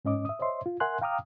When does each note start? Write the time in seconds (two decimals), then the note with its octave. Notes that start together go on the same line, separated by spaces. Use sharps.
0.05 G#2 C#4 D#5 D6
0.25 E5 D#6
0.39 C5 C#5 D#5 E5 C6
0.66 F4
0.80 A#4 E5 F#5 G#5 C6 F#6
1.02 F5 G5 A#5 D6 D#6 F6